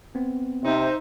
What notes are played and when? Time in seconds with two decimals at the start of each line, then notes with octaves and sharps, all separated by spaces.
0.15 B3 C4
0.64 C3 D#4 C5 E5